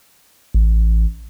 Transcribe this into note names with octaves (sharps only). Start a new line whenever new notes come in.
A1